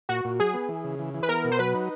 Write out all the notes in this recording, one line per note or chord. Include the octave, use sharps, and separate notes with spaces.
A#2 F#4
A#2
F#3 G#4
B3
E3
C#3
E3
E3
B4
B3 A#4
B2
C5
F#3 B4
D#4